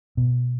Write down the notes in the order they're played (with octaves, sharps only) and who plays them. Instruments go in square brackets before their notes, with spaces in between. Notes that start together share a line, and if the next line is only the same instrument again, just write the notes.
[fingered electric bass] B2